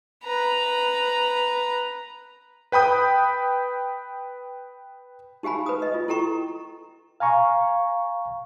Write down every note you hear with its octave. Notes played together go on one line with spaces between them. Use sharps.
B4 A#5
B4 G5 B5 D#6 G6
D#4 G4 F5 G#5 B5
B4 D#6
D#5
F4
E4 A4 G5 A#5 C#6
F5 G#5 A#5 C#6